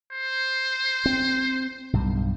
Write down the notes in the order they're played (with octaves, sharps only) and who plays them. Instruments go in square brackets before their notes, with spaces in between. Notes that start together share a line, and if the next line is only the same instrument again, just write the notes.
[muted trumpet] C5
[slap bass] C4
B1 G2